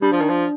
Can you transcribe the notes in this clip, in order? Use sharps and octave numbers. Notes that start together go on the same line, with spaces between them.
G3 D4
F3
D#3
F3